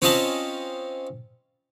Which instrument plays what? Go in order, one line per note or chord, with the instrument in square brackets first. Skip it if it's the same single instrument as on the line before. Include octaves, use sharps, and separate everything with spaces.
[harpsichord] C4 C#4 F4 D#5 A5 B5